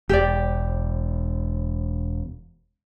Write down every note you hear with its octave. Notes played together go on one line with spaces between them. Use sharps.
E1 G4 D5